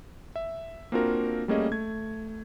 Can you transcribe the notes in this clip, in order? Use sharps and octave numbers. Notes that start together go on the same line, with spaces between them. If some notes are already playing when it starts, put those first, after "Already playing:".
E5
A#3 C4 D4 F4 F#4 A#4
G3 A3 A#3 C#4 G#4 D#5
A3 G#6